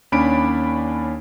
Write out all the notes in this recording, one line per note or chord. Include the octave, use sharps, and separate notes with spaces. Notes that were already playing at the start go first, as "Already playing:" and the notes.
D#2 C#4 D4 D5 B5 D7